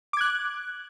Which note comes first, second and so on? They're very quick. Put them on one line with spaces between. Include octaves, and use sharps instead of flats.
D6 G#6 F#6